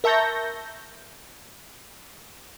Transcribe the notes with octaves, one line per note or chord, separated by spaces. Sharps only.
A#4 E5 A5 C#6 G6 A#6